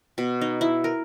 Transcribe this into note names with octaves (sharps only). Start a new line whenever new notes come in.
B2
D#4
E4
A#4